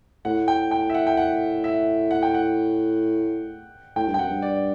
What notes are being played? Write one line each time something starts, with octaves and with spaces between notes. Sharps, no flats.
A2 F#5
G5
G5
E5
F#5
G5
F#5
E5
F#5
G5
F#5
A2 G5
G2
G5
F#2 F#5
G2
D5